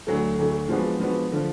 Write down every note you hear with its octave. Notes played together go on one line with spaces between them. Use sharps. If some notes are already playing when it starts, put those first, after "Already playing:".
D2 D3 F#3 A3
D2 D3 F#3 A3
F3 G#3 B3 D4 F#4
F3 G#3 B3 D4 F#4
D3 F3